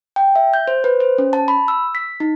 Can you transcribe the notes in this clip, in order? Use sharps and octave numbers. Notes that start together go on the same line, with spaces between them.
G5
E5
G6
C5
B4
C5
C#4
A5
B5
E6
B6
D#4